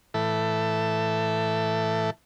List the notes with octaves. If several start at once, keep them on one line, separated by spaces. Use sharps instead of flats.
A2 E3 A4 E5